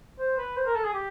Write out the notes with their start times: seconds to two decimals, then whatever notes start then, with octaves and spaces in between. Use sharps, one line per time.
0.19 C5
0.38 B4
0.56 C5
0.66 A#4
0.75 A4
0.84 G#4
0.94 G4